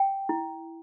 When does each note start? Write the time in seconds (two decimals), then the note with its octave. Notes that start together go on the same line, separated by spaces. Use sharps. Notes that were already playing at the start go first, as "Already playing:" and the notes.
Already playing: G5
0.29 E4